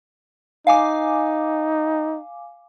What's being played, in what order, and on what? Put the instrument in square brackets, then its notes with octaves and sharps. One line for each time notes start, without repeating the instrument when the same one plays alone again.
[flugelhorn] D#4 [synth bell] F5 G#5 D6